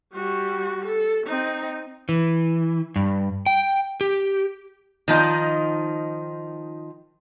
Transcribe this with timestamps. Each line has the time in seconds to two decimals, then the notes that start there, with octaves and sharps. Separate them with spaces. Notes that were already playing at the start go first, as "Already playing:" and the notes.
0.14 G3 F#4
0.85 A4
1.27 C4 D#4
2.09 E3
2.96 G2
3.46 G5
4.01 G4
5.08 D#3 F3 D#4